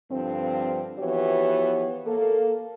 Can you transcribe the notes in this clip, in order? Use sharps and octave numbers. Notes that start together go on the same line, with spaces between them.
G2 D3 F3 C4
E3 F3 B3 F#4 G4 C#5
A#3 A4